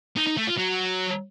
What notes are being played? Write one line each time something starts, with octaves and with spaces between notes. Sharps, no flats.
D#4
D#4
A3
F4
F#3